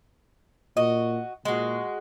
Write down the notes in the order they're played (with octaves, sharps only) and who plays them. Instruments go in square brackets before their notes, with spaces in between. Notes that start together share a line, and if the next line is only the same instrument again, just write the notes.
[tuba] A#2 [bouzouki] F#4 D#5
[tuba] A#2 [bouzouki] G#3 F#4